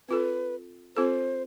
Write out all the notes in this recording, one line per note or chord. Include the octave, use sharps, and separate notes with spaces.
C4 F4 A4 B4
C4 F4 A4 C5